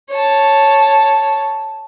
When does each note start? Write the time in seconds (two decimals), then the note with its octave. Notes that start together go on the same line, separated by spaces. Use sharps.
0.10 C#5 A5